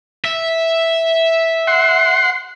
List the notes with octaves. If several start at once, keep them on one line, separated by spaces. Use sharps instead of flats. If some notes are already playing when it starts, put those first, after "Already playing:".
E5
F#5 C6